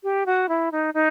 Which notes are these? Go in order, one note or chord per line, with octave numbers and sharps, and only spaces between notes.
G4
F#4
E4
D#4
D#4